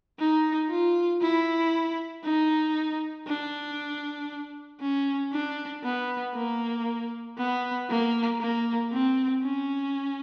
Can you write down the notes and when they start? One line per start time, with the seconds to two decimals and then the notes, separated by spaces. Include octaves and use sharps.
0.20 D#4
0.70 F4
1.22 E4
2.24 D#4
3.27 D4
4.81 C#4
5.32 D4
5.84 B3
6.35 A#3
7.38 B3
7.90 A#3
8.41 A#3
8.92 C4
9.43 C#4